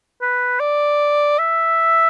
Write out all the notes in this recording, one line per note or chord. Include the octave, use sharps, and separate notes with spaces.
B4
D5
E5